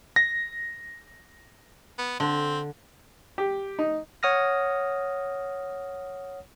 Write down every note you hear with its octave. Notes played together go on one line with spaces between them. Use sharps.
A#6
B3
D3 C4
G4
D#4
C#5 F#5 D#6 F6 A#6